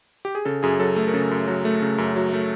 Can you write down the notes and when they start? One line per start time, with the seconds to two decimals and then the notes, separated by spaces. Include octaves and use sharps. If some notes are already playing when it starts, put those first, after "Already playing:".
0.25 G4
0.35 G#4
0.45 C#3 A4
0.63 F#2 G#4
0.79 F#3 A4
0.96 A3
1.07 A#4
1.14 C#3 A4
1.31 F#2
1.48 F#3
1.65 A3
1.82 C#3
1.98 F#2
2.16 F#3
2.33 A3